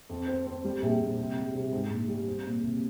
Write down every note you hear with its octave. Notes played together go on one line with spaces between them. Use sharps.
F2
C4
C4
G3
A#1
A#1
C3
G3
C3
G#2
A#1
G3
C4
A#2
C2